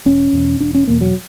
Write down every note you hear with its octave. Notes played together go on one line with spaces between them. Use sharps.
E1 C#4
E2 B2
E1 D4
C#4
E2 B2 A#3
F#3